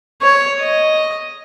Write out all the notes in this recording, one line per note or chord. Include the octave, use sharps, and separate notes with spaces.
C#5
D#5